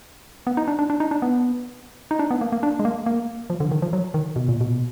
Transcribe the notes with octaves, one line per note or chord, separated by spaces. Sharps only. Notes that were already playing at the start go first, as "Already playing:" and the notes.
B3
D#4
D4
D4
D4
D#4
D4
B3
D#4
D4
B3
A#3
A#3
D4
G#3
A#3
A#3
F3
D3
D#3
F3
F#3
D#3
B2
A#2
B2